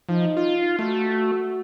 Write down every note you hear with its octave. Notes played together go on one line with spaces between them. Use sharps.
F3 D#4
F4
A3 F#4